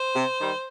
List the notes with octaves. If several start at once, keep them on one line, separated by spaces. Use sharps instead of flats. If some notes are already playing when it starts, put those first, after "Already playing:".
Already playing: C5
C3
D#3 G3